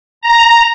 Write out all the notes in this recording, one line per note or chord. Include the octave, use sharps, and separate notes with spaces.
A#5